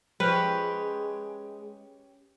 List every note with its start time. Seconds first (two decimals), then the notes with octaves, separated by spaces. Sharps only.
0.20 F3 G#3 C#4 G4 B4